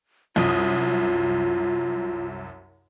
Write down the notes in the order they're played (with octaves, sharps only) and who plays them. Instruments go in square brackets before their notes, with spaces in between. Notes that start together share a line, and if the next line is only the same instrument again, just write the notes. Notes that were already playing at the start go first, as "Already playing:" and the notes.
[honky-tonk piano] C2 F#2 D#6 [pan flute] F4